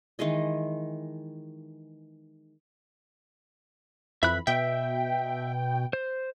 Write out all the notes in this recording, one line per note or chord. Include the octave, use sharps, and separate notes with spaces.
D#3 E3 G#3 D#5
F2 E3 E5 B5 F#6
B2 E5 G5
C5